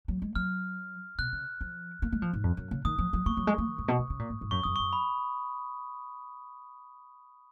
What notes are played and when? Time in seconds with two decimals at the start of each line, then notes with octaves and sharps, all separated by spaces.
0.08 F#3
0.22 G#3
0.35 F#3 F6
1.18 B2 F#6
1.33 C#3
1.61 F3
2.02 A#3
2.12 G#3
2.22 F3
2.33 G#2
2.44 F2
2.57 F#2
2.71 C#3
2.85 D#3 D#6
2.98 F3
3.13 F#3
3.26 A#3 C#6
3.37 F#3
3.47 G#3
3.58 A#3
3.68 D#3
3.78 G#2
3.88 B2
3.99 D#3
4.10 C#3
4.19 A#2
4.30 G#2
4.41 G#2
4.51 F#2 C#6
4.63 F#2 D#6
4.76 C#6
4.79 F#2
4.93 B5